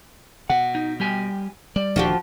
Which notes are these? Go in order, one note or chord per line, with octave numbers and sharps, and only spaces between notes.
B2 F#5
D#4
G3 G4 G#5
G3 D5
D1 D#2 F3 D4 F#4 G4